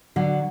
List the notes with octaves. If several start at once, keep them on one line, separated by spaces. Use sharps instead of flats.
D3 F#3